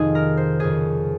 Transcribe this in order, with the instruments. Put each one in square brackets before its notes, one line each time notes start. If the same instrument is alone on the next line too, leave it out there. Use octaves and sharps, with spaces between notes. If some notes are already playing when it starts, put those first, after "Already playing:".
Already playing: [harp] F2 C3 D#3 D#4 F4 G#4
A#4
C5
F2 C#3 G#4